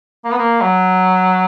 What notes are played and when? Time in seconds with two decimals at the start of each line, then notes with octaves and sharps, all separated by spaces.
0.24 A#3
0.31 B3
0.38 A#3
0.61 F#3